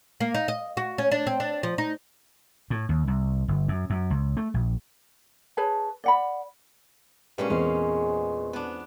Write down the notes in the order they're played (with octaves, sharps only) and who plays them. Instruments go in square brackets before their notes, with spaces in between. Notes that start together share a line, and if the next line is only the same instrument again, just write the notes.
[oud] A#3
D#4
D#5
F#4
C#4
D4
C4
D4
F3
D#4
[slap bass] A2
D#2
C2
G1
F#2
F#2
C#2
A3
A#1
[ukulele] G#4 B4 C#5 A5
D5 F#5 B5
[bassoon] G2 [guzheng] A#2 G#3 C#4
[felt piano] E2 C4 [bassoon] G#3 [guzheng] F5
[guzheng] B3 D4